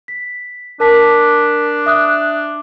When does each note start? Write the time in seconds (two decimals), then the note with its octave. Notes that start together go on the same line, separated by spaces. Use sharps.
0.08 B6
0.80 D4 A#4 A5 B6
1.86 E5 D#6 F#6